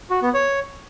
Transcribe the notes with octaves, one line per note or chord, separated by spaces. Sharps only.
F#4
B3
C#5